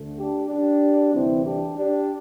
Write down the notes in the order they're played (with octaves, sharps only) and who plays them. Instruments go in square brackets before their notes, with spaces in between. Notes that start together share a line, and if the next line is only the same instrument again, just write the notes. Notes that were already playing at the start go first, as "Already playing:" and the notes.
Already playing: [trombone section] D2 D3 A3
D4 G4
D4 G4
D2 C3 E3 G3 C4 E4
D4 G4
D4 G4